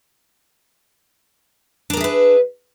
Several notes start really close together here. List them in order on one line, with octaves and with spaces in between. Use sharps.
D4 A#4 G#4 E5 B4